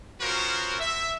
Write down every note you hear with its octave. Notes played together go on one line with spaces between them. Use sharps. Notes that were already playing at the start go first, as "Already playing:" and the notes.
B3 C#4 F4 F#4 A#4 C5
E5